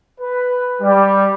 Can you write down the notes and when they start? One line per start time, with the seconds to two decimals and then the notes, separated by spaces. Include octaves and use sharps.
0.20 B4
0.82 G3